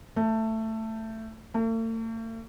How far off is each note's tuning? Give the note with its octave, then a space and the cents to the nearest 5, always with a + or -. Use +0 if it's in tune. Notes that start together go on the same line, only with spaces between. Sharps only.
A3 +15
A3 +45